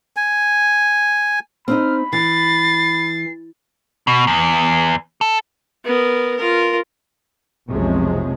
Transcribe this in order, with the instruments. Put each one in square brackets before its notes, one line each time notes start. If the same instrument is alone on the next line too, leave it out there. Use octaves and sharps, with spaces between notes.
[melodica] G#5
[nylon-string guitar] C4 D4 D#4 [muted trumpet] B5 [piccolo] F6
[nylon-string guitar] E3 [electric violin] A6 [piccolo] C7
[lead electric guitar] B2
E2
A4
[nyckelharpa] B3 A#4
F4 A#4
[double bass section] F1 B1 C3 F3 G#3 C#4